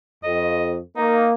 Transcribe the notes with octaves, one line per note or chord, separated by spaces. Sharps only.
F2 D#5
A#3 D#4